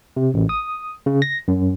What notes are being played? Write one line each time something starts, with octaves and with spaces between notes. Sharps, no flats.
C3
A1
D#6
C#3
A#6
F#2